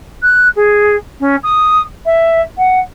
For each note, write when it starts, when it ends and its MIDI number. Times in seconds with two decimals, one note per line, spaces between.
0.22 0.49 90
0.56 0.96 68
1.20 1.36 61
1.44 1.82 87
2.06 2.42 76
2.58 2.80 78